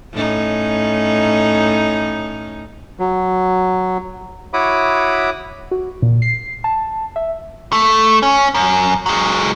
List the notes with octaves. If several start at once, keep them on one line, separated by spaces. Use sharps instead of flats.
A2 C#4 D#4
F#3
E4 F#4 C#5 B5 D6 D#6
F#4
A#2
C7
A5
E5
A3
C#4
F#2
F#3 G#3